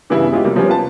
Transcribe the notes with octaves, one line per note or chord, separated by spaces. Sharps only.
G2 C#3 E3 G3 B3 E4
G#3 E4 F4 G4
C3 F#3 G3 A#3
F3 G3 A#3 B3 C#4
F4 B4 A5